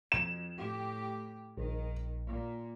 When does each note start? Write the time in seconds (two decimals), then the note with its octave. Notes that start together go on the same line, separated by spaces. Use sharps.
0.12 F2 E7
0.59 A2 G4
1.57 A#1 D#3
2.27 A#2